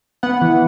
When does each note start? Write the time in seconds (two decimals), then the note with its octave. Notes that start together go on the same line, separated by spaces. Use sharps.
0.23 B3 F#5
0.41 E3